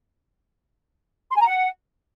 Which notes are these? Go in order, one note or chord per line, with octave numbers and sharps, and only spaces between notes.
C6
G#5
A#5
F#5